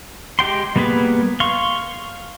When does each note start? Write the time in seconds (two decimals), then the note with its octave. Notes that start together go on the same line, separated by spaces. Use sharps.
0.39 G#3 G4 G5 C6
0.76 G3 A#3 B3 G#4 B4
1.40 F5 C6 C#6